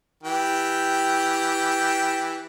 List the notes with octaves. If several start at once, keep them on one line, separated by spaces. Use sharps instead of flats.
E3 G4 G5